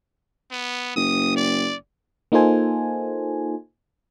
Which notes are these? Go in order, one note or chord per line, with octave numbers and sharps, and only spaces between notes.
B3
F#1 D#6
D5
A#3 D#4 F4 A4 C5 G#5